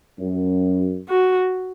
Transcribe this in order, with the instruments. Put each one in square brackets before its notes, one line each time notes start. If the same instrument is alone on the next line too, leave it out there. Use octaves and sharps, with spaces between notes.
[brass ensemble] F#2
[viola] F#4